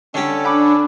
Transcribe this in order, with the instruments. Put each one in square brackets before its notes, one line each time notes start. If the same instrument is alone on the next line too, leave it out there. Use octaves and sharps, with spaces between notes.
[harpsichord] D3 G4 [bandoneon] C#4 A4
[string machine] D4 [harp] F#5 B5 D6